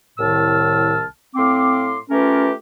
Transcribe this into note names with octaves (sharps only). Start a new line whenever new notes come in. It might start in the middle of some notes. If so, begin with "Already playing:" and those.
C2 A2 D#3 A5 E6 F6
A2 C4 F5 C6 D6
A3 C#4 F4 G4 A#4 B4